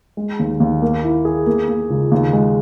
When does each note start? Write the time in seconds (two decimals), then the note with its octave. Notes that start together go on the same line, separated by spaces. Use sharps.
0.17 G#3
0.39 D#2
0.60 D#2
0.82 A#3
1.03 E4
1.25 G#4
1.47 A#3
1.68 A#3
1.90 C#2
2.12 D#2
2.33 G#3